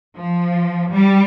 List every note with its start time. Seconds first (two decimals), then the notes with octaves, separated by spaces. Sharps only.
0.17 F3
0.92 G3